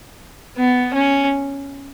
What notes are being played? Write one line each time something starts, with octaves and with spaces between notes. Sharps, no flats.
B3
C#4